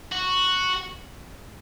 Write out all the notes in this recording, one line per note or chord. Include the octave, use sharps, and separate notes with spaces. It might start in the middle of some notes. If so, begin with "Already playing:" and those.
F#4